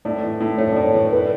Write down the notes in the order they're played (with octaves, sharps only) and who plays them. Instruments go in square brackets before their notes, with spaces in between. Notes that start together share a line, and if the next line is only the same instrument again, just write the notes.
[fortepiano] A2 [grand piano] D5
[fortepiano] E3
A2
[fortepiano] A3 [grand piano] C#5
[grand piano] D5
[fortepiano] A2 [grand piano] C#5
[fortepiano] E3
[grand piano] B4